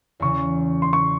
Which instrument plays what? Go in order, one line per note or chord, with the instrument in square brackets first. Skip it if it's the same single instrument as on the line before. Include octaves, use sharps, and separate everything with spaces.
[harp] E2 C#3 E3 [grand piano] C#6
[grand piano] C6
C#6